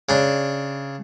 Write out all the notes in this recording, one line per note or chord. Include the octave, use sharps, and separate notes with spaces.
C#3 D4